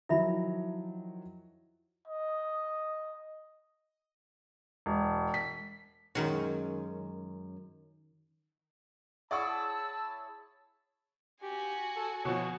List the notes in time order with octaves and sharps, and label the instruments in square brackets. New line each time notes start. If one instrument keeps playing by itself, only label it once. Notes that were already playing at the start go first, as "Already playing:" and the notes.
[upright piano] D#3 F3 F#3 [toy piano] E4 E5 B5
[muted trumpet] D#5
[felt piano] E1
B6
[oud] F#2 G#3 C#4 [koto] D#3 F#4
[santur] E4 G#4 C#5 [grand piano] D5 F#5 C#6 [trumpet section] A5 [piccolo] E6
[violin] F#4 G#5 [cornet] G4
[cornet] A4
[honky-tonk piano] B2 F3 [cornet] C#5